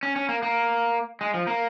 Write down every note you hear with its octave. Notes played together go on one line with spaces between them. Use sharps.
C#4
C#4
A#3
A#3
G#3
F3
A#3